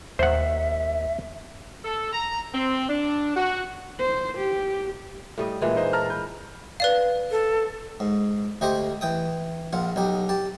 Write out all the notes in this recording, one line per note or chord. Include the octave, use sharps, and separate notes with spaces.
D#2 C5 E5 F#5
A4
A#5
C4
D4
F#4
C5
G4
A2 G3 D#5
A#2 E3 G#3
D#4 C5 D#5
A5 A#5 F6
B4 G6
B4 D5 F5
A4
G#2
D2 A3 G4 C5 D#5
E3 G5 D#6
A#1 F4 F#5
B1 D#4 G4
G4 A5